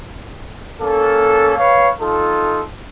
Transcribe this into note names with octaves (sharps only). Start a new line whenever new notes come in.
A#3 C#4 A4
B4 C#5 F5
D#4 F4 A4